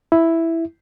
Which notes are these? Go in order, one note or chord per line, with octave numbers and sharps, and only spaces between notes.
E4